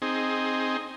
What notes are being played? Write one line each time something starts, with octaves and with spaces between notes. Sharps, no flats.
C4 D#4 G#4